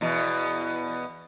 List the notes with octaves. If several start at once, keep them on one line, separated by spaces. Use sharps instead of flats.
E2 B2